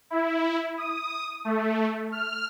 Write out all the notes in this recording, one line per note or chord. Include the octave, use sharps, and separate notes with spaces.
E4
D#6
A3
F6